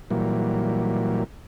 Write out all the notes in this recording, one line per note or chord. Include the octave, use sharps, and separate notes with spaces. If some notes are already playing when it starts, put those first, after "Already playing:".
A#2 E3 F#3 G3 A#3